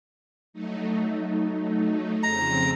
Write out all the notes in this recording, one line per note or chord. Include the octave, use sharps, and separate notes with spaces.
F#3 A3 D#4
F2 C#3 C4 A#5